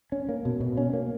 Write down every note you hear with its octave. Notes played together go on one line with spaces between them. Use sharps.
C#4
A#3
B2
B2
C#4
A#3